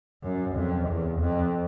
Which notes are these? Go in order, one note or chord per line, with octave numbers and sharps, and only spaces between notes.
F#2
F2
E2
F2